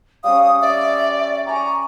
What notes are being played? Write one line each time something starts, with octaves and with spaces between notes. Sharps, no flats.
G3 C#4 F5 D#6
D5 E5
G4 G#5 A#5 C#6